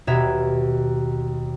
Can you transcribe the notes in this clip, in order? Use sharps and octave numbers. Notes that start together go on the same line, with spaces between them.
D#2 B2 E5 A#5 G#6